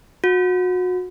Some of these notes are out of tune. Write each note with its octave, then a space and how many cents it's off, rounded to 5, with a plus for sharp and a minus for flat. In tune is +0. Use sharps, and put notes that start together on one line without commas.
F#4 -30